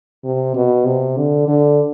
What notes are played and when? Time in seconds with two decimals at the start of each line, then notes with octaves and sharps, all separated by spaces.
0.24 C3
0.55 B2
0.86 C3
1.17 D3
1.48 D3